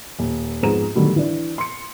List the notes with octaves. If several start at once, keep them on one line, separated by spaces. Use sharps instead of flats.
D#1
F2 G#2 B3 G#4 A#5 E7
B2 D3 D#3 F#3 G3 A3
E3 D4
C6 C#7